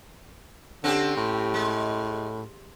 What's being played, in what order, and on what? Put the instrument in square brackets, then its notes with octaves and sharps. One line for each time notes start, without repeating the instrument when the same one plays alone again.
[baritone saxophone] D3 [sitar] C4 C#4 G4
[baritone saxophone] A2
[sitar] G#3